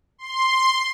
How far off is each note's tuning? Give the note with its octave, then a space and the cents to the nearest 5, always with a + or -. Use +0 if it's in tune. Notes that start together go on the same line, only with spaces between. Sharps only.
C6 +5